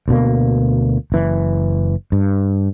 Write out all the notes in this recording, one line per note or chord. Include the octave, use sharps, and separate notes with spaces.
D2 B2 A#3
F#1 E3
G2